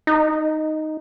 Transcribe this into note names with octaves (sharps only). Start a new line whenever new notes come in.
D#4